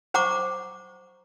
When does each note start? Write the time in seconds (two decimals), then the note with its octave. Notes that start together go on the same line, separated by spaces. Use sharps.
0.14 C5 F#5 A#5 C#6 D6